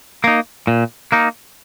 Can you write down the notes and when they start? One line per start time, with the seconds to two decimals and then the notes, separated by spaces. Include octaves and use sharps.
0.24 A#3 D#4
0.67 A#2
1.12 A#3 D#4